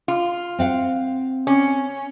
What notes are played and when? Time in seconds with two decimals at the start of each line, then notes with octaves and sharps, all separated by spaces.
0.08 F4
0.59 C4 F5 F#5
1.47 C#4